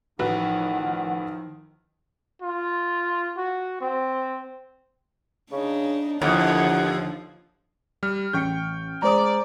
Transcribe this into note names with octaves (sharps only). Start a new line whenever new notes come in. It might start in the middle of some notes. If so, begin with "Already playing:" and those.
A1 D#3 F3 F#4 B4 F#5
F4
F#4
C4
C#3 D4 D#4
D#2 A2 D3 F3 E4 F#5
G3 F6
A1 G5 C#6 G6 C#7
G#3 C5 D5 A#5 D#6